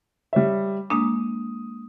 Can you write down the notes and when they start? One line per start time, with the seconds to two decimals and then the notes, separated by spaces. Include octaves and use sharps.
0.33 G3 C#5 E5
0.90 G#3 A#3 D4 D#6